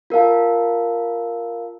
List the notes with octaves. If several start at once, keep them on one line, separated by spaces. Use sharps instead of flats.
F4 A#4 F5 A5